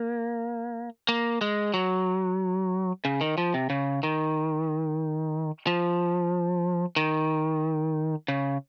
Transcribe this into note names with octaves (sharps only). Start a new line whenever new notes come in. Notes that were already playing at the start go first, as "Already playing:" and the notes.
Already playing: A#3
A#3
G#3
F#3
C#3
D#3
F3
C3
C#3
D#3
F3
D#3
C#3